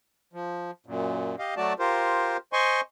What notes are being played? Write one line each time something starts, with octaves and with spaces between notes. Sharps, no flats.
F3
F#2 A#2
G4 D#5 F5
F#3 A3 F#4 D5 A5
F4 G4 A#4 C5
C5 D#5 G#5 C6 C#6